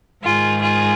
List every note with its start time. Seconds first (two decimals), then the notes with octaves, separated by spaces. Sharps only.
0.24 G#2 D#3 F4 G#4
0.62 F4 G#4